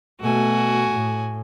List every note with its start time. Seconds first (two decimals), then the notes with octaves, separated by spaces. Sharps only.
0.20 B2 A3 F#4 G#5
0.89 A2